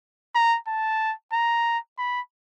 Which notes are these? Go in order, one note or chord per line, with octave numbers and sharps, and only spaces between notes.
A#5
A5
A#5
B5